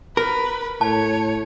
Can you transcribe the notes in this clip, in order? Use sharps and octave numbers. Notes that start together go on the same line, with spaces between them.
A#4 B4
A2 C#5 A5